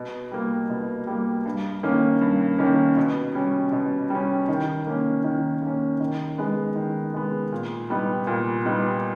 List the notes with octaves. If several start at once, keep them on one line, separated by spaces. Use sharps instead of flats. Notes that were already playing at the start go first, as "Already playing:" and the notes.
Already playing: B2
G3 A#3
B2
G3 A#3
G2
D#3 A#3 C#4
G2
D#3 A#3 C#4
B2
G3 C#4
B2
G3 C#4
D#3
A#3 C#4
D#3
A#3 C#4
D#3
G#3 B3
D#3
G#3 B3
A#2
G3 B3 D#4
A#2
G3 B3 D#4